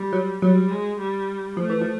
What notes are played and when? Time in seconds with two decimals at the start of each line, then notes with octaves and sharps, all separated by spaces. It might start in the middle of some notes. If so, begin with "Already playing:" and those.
Already playing: G3
0.13 F#3
0.42 F#3 G3
0.71 G#3
1.00 G3
1.57 F3 A3
1.70 E3
1.81 F3